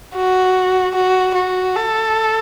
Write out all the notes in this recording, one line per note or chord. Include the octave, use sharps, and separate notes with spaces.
F#4
F#4
F#4
A4